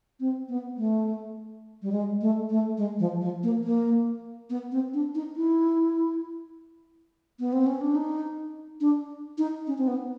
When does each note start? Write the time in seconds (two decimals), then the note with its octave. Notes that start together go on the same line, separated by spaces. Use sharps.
0.20 C4
0.49 B3
0.77 A3
1.82 G3
1.92 G#3
2.21 A3
2.50 A3
2.77 G#3
2.99 F3
3.21 F3
3.43 A#3
3.64 A#3
4.50 B3
4.72 C4
4.94 D4
5.15 D#4
5.36 E4
7.40 B3
7.53 C4
7.66 C#4
7.81 D4
7.95 D#4
8.81 D4
9.38 D#4
9.67 C#4
9.78 C4
9.88 B3